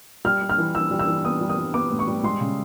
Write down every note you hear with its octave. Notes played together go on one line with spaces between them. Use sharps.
G3 F6
G3
F6
E3
E3 E6
G3
E6
E3
B3 D#6
G3
D#6
G3
B3 D6
A2
C#6
G3
G#3 C6
C#3